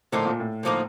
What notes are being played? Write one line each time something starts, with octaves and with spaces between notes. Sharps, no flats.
A2 D3 F3 A#3 D#4
A#2
A2
D3 F3 A#3 D#4